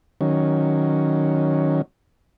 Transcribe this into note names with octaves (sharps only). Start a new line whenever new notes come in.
D#3 F#3 C#4